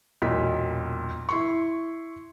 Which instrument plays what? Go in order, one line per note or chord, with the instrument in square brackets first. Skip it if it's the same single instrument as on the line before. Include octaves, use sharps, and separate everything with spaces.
[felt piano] E1 B1 A#2 B6
E4 C6 C#6